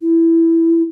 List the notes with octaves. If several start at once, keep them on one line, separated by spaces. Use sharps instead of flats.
E4